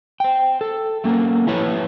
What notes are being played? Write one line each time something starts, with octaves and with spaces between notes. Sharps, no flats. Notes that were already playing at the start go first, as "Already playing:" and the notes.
C5 G5
A4
A3 A#3 C#4 A#4
F3 A3 E4 B4 C#5